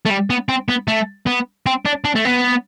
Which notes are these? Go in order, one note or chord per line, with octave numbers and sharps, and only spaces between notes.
A3
G3
B3
C4
B3
A3
B3
C4
D4
D4
A3
B3